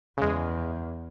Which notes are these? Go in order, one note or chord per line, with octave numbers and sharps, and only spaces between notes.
E2 C#3 G#3